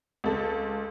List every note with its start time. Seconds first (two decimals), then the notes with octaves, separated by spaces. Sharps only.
0.24 C#2 A4